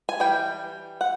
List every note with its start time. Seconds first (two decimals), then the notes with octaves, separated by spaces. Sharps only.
0.09 G#5
0.20 E3 G3 G5
1.01 F#5